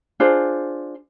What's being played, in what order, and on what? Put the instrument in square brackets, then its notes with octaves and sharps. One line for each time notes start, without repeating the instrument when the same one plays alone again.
[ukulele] D4 F4 G#4 C5